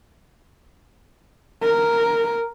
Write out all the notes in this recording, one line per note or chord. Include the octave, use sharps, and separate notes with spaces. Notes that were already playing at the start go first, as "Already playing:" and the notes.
A#4